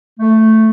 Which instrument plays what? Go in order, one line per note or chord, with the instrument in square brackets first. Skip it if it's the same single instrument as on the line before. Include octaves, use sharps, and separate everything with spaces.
[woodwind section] A3